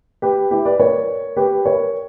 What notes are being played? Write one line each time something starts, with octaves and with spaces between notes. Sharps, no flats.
G4 B4
E4 G4
B4 D5
A#4 C#5
G4 B4
A#4 C#5